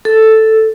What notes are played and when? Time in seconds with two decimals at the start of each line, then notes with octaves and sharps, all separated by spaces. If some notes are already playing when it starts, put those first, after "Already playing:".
0.05 A4